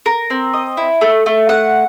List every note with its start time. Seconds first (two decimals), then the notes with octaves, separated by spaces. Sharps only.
0.06 A#4
0.30 C4
0.54 D#5
0.77 E4
1.01 A3
1.26 A3
1.49 F#5